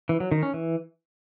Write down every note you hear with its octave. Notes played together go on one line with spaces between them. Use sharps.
E3
F#3
D#3
C#4
E3